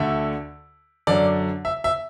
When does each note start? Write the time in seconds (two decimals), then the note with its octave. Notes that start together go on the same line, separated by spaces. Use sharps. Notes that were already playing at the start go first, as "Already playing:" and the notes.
Already playing: D2 D3 E5
1.07 F#2 D3 D5
1.65 E5
1.84 E5